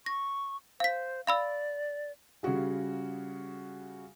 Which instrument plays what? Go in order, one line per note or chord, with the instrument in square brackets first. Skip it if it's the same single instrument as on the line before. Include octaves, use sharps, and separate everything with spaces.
[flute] C#6 [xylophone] A#6
[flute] C5 [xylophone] F5 B6
[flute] D5 [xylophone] F5 B5 E6
[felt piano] C#3 G3 F4 F#4 G#4